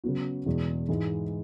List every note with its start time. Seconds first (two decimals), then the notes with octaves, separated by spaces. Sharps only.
0.04 C#3 F#3 B3 F#4
0.46 E2 B2 G#3
0.89 G#2 E3 G#3